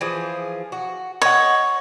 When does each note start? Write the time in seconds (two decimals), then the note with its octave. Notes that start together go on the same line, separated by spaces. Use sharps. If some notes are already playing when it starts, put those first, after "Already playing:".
0.01 E3 F3 G#4
0.72 F#4
1.22 C#5 D#5 F#5